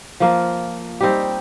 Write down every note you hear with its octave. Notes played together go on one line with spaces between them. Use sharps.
F3 A#3 F4 A#4
G3 C4 D#4 G4